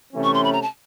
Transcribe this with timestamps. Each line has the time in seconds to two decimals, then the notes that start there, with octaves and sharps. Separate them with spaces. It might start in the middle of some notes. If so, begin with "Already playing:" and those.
0.13 C3 E3 A3 C#4
0.24 C#6
0.34 C6
0.44 B5
0.53 A#5
0.62 A5